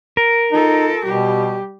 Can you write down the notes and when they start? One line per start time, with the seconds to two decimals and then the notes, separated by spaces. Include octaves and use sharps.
0.17 A#4
0.52 D#4 F4 A4
1.05 B2 G3 G4